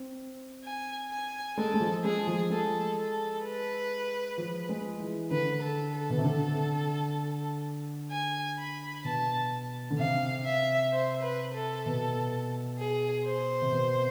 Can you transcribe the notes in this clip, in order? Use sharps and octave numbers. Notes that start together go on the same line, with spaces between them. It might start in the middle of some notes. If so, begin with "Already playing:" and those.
Already playing: C4
G#5
G#5
G#3 A4
G#3
F3
G#3 G#4
F3
G#3 A4
A4
B4
F3
G#3
E3
D3 B4
A4
A4
B2
C3
D3
G#5
B5
B2 A5
D3
C3 F5
E5
C5
B4
A4
B2
G#4
C5
C3
B2